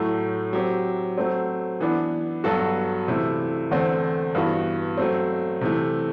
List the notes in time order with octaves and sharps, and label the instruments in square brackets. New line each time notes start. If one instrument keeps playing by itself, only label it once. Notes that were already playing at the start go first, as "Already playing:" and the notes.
Already playing: [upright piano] A2 F#3 A3
F#3 C4 G4
F#3 A3 C4
E3 B3 D4
G2 F#3 B3 F#4 A4
C3 E3 A3 E4
E2 D3 A3 C4
G2 E3 B3 F#4
F#3 A3 C4
C3 E3 A3